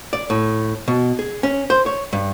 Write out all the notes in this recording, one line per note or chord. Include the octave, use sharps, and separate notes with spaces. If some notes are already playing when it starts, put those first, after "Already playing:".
D5
A2
B2
G#4
C#4
C5
C#5
G2